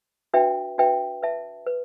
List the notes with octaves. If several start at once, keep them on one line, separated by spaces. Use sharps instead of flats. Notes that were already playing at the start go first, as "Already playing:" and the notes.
D4 F#4 B4 E5 G5
D4 F#4 B4 E5 G5
B4 E5 A5
B4